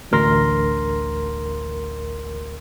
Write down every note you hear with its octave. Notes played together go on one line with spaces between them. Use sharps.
A1 D2 A#4 C6 A#6